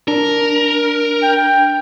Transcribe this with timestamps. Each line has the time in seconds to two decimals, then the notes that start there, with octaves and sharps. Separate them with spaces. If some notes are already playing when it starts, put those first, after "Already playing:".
0.08 D4 A#4
1.23 G5